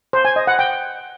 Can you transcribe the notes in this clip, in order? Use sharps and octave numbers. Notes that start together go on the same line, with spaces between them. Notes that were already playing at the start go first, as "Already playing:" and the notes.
C5
G#5
D#5
F#5
G5